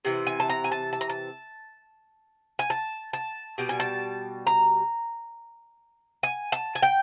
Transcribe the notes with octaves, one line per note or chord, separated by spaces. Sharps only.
C3 E3
G#5
A5
A#5
G#5
A5
A5
A#5
A5
G#5
A5
A5
B2 G3
G#5
A5
A#5
G#5
A5
G#5
G5